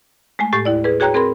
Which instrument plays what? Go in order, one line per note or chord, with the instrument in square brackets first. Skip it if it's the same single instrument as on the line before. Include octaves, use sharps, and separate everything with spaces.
[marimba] G#3 A3 G#5
A2 G4 A6
D#2 E4 D5
G#4 B4
F#4 G#4 C#5 G5 A#5 F#6
C4 G#4 A#4 B5 C6